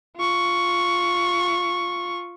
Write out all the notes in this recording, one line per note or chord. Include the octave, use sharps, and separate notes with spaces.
F4 C#6